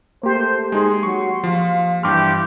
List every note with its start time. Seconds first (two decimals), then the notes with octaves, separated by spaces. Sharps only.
0.23 A3 A#3 G4 C5
0.72 G#3 D#4 G#4 C6
1.03 F#3 C#6
1.44 F3 F5
2.03 G2 E3 G4 C6 D6 F6